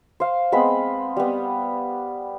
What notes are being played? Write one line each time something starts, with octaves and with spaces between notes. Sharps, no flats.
C5 F5
G#3 B3 C4 B5
G3 B3